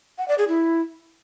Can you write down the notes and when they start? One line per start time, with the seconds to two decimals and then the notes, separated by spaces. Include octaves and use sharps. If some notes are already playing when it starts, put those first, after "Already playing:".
0.18 F#5
0.28 D5
0.38 G#4
0.48 E4